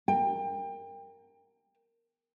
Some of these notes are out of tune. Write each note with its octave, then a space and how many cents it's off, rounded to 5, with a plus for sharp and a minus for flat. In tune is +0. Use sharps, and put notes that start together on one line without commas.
A#4 -10 G5 +25